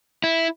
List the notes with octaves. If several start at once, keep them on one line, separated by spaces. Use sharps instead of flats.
E4